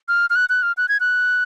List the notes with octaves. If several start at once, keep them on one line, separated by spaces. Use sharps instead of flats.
F6
F6
F#6
F#6
F6
F#6
G#6
F#6